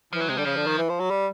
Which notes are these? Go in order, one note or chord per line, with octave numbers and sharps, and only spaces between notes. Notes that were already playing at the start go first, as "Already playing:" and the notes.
E3 F3
F#3
C3 G#3
D3 G3
C#3 F3
D3
D#3
E3
F3
F#3
G3